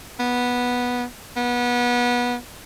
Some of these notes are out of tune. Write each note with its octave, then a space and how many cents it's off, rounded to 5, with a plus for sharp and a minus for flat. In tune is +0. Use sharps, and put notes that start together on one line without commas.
B3 -10
B3 -25